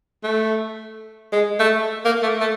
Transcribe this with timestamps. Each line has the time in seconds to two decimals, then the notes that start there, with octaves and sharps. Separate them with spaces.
0.23 A3
1.32 G#3
1.59 A3
2.05 A#3
2.23 A3
2.40 A3